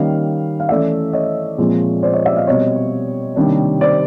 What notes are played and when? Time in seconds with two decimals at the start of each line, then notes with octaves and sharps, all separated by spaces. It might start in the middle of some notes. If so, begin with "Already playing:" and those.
Already playing: D#3 G3 A#3 C#4 D#5 F5
0.60 F5
0.69 E3 A3 C#4 D5 E5
1.13 C#5 D#5
1.58 A#2 F3 G#3 C4
2.03 C5 D5
2.13 C#5 D#5
2.26 D5 E5
2.36 D#5 F5
2.47 B2 G3 C4 C#5 D#5
3.36 C3 D#3 G3 A#3 D4
3.81 C5 D5